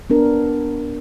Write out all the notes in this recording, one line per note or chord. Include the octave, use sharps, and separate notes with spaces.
B3 D4 A#4